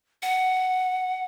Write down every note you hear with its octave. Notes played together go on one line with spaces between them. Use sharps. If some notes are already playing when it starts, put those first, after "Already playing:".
F#5